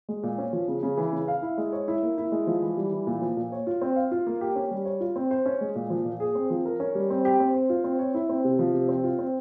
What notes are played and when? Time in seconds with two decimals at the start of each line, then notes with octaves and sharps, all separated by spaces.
0.09 G#3
0.23 A#2
0.38 C#4
0.53 F3
0.68 C#3
0.83 C#3
0.97 E3
1.13 C#3
1.28 F5
1.42 E4
1.58 G#3
1.72 C#5
1.88 E4
2.02 A#3
2.18 E4
2.32 G#3
2.47 F3
2.62 E3
2.77 G3
2.92 E3
3.07 A#2
3.22 F3
3.37 A#2
3.52 C#5
3.67 F4
3.81 C4
3.96 F5
4.11 F4
4.27 A#3
4.41 G4
4.56 C#4
4.71 G3
4.85 C#5
5.00 F4
5.16 C4
5.31 C5
5.46 C#4
5.61 G#3
5.75 A#2
5.90 F3
6.05 A#2
6.20 G#4
6.35 C4
6.50 F3
6.65 A#4
6.80 C#4
6.95 G3
7.10 C4
7.25 G4
7.40 C4
7.54 C5
7.70 F4
7.84 C4
7.99 C#5
8.14 E4
8.29 C4
8.44 C3
8.59 F3
8.74 C3
8.88 C4
9.04 F4
9.18 C4